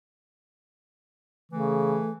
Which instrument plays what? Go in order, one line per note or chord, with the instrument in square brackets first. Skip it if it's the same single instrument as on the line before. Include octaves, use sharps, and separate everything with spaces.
[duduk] C#3 [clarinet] E3 [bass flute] A3